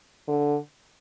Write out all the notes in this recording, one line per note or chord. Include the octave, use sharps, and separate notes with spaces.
D3